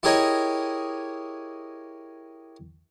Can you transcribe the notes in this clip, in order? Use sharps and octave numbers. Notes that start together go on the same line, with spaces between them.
E4 G4 G#4 A#4 C#5 D#5